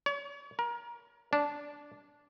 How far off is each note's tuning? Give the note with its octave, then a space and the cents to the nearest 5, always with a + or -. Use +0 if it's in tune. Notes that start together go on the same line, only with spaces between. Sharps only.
C#5 +40
A#4 +25
D4 -10